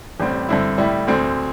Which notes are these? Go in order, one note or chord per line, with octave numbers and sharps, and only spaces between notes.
A1 A2 G3 C4
G2 D3 C4 E4
A2 G3 E4
D2 D3 C4